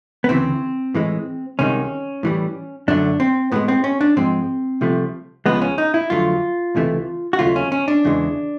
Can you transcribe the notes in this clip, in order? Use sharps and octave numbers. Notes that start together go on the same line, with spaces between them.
B3
D2 C#3 E3 C4
A2 E3 G#3
C2 C3 D#3 G#3 C#4
A2 E3 G3
F#2 D3 F#3 A3 D4
C4
A2 F3 G#3 B3
C4
C#4
D4
G#2 F3 G#3 C4
C2 C3 F3 A3
C#2 C#3 F3 G#3 B3
C#4
D#4
E4
F2 D3 F#3 A3 F4
C#2 C3 E3 A3
F#4
D#2 C#3 F#3 A3 F4
C#4
C#4
D4
E2 C#3 E3 G#3